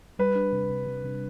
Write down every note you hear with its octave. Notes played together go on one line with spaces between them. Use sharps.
G3 B4
D4
C3
C3
C3
C3